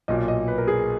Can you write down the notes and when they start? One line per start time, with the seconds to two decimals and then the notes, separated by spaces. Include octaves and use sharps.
0.08 B1 A#2 D#5
0.28 D#5
0.48 B4
0.58 A#4
0.68 G#4